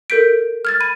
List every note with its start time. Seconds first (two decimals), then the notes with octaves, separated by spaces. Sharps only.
0.10 A4 A#4 G6 B6 D7
0.65 F6 G#6 A6
0.80 B5 D#7